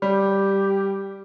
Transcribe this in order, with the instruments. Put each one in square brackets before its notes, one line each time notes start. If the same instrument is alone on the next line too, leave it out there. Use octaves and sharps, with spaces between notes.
[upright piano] G3 [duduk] G4